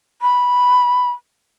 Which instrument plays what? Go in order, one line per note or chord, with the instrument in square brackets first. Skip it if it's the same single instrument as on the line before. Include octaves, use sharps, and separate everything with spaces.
[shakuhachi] B5